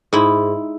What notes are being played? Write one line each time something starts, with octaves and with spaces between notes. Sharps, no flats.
G#2 E4